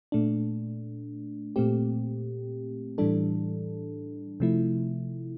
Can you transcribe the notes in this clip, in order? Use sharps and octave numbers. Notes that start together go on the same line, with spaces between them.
A#2 A3 D4
A#2 A3 C4 G4
A2 E3 G3 D4 A4
C3 F3 A3 E4